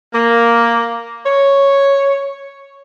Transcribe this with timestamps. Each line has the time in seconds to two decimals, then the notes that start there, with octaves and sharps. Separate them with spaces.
0.14 A#3
1.26 C#5